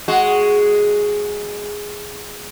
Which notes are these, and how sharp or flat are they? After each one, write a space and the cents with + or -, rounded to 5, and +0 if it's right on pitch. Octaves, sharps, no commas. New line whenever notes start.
G#3 +0 F#4 +0